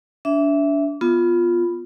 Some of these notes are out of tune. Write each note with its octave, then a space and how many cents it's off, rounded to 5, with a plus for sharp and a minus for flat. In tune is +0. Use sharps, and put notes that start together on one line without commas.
D4 -30 E5 +0
B3 +0 F4 +0